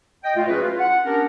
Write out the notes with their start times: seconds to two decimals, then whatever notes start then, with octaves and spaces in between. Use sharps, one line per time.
0.24 D#5 G5
0.36 A#2 A3 F4
0.48 F#3 A3 C#4 F#4 G#4 B4
0.63 F4
0.79 F#5
1.06 B3 C#4 D4 G4 A#4